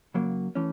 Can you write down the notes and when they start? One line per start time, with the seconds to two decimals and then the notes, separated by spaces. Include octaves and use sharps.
0.14 C#3 F#3 A#3
0.55 E3 A3 C#4